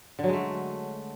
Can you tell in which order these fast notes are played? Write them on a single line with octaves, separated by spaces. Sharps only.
D3 F#3 G#3 A3